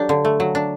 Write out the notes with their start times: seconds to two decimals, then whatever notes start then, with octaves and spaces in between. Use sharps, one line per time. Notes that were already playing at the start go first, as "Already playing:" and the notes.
Already playing: F#3 D4 G4 A4
0.09 D3
0.25 A3
0.40 F#3
0.55 D4